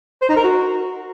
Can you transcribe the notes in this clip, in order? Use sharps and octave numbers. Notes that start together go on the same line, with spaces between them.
C5
D#4
A#4
F#4